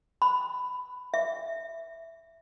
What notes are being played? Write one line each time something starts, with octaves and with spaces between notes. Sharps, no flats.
B5
E5